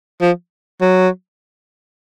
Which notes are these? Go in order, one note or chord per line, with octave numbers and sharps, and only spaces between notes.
F3
F#3